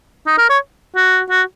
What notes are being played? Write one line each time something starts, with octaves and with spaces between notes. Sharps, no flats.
D#4
A#4
C#5
F#4
F#4